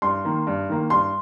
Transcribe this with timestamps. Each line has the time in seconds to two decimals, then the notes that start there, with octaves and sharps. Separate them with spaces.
0.02 G2 C6
0.25 D#3 A#3
0.47 G2
0.69 D#3 A#3
0.90 G2 C6